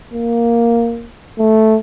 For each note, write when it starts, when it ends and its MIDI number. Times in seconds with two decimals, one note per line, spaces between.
0.13 1.08 58
1.39 1.78 57